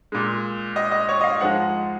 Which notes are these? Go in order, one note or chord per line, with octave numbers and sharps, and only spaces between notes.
A#2 G#3
D#5
D#5
C#5
D#5
F5
G#2 F3 G#3 F#5